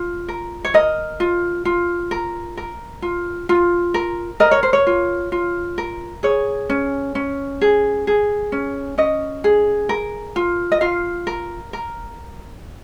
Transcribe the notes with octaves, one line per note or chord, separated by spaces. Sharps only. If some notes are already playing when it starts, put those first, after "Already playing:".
Already playing: F4
A#4
C#5
A#4 D#5
F4
F4
A#4
A#4
F4
F4
A#4
A#4 D#5
C#5
C5
C#5
F4
F4
A#4
G#4 C#5
C#4
C#4
G#4
G#4
C#4
C#4 D#5
G#4
A#4
F4
D#5
F4 F5
A#4
A#4